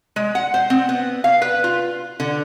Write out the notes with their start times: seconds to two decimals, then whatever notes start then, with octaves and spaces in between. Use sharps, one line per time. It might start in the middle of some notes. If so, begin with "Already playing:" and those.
0.16 G#3
0.35 F#5
0.54 C5
0.70 C4
0.89 B3
1.24 F5
1.42 B4
1.64 F4
2.20 D3